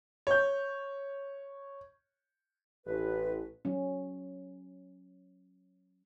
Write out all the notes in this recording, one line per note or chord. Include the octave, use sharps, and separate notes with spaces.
C#5 G6
A1 B4
F#3 C#4